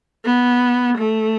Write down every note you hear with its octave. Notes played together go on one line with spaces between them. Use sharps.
B3
A3